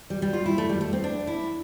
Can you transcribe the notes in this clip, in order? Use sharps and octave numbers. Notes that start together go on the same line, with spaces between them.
G3
G3
F4
E4
A3
G3
A3
C4
D4
E4